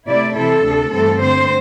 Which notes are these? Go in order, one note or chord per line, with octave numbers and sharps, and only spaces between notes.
C3 A3 E4 D5
C3 E3 C4 E4 A4
D2 C3 A3 D4
G2 E3 A3 C4 A4
D3 A3 C4 C5